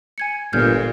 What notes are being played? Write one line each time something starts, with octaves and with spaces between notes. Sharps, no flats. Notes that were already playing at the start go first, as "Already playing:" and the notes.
G#5 G#6 C#7
G1 A#2 G3 F6 G6 G#6